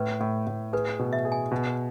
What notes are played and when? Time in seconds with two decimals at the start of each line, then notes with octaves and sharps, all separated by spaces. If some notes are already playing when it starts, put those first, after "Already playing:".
Already playing: A2 B4
0.20 A2
0.47 A2
0.73 G#4 B4
0.99 B2
1.13 E5
1.25 G#4
1.32 G#5
1.52 B2